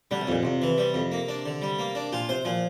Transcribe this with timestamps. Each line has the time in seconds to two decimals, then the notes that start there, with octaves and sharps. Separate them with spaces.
0.11 D3 G3
0.21 C3
0.27 F2 A#2
0.43 F2 C3
0.62 E3
0.78 G3
0.94 F2
1.12 A#3
1.29 D4
1.46 D3
1.62 G3
1.79 A#3
1.95 D4
2.12 A#2 F4
2.29 C3 C5
2.45 A#2 F3